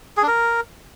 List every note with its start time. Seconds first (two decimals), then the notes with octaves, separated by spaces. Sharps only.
0.17 G#4
0.22 D4
0.28 A#4